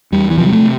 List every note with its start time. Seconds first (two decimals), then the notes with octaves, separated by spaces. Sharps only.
0.12 E2 G3
0.30 E3
0.38 C3 F3
0.46 G3
0.53 A3